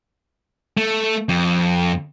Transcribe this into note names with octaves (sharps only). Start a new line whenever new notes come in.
A3
F2